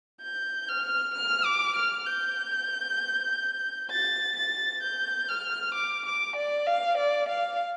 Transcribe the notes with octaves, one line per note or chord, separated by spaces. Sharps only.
G6
F6
F6
D6
F6
G6
A6
A6
G6
F6
D6
D6
D5
F5
D5
F5